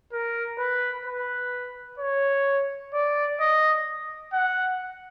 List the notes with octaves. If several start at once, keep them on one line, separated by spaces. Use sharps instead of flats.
A#4
B4
B4
C#5
D5
D#5
F#5